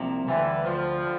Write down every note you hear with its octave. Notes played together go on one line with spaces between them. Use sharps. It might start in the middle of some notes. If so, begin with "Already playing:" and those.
Already playing: C2 C3 F3 A#3
D2 D3 E3 G3
D2 D3 F3 G3
D3 G3